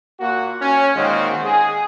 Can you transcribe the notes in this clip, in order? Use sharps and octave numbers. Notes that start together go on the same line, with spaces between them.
A#2 A#3 F#4
C#4
A#2 D#3 G#3 C4 F#4
G#4